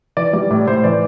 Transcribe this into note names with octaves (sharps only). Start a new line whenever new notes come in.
E3 D5
G3 D5
A2 D5
A2 C5
E3 D5